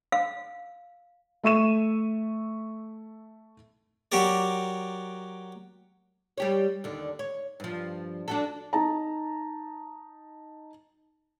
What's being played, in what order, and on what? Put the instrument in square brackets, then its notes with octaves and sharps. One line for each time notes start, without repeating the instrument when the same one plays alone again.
[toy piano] F5
[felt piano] A3 E5 C#6 D#7 E7
[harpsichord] F#3 F#4 G4 A#4 D5
[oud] G3 G4 C#5
D#2 D3
C#5
G2 F3
D4 F#4 A4
[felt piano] D#4 A5 A#5